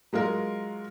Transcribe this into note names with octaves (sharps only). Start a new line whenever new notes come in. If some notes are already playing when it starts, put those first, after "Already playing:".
F#3 G#3 F4 A#4